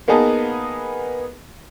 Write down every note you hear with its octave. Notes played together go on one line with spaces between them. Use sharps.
A#3 B3 D#4 G#4 B4 A5